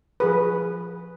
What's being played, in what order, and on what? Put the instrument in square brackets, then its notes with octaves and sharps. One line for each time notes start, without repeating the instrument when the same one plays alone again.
[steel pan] F3 G#4 B4